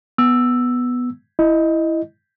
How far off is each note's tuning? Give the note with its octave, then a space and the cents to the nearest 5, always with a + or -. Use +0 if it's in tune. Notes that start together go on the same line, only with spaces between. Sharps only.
B3 +0 E6 +0
E4 +0 D#5 +0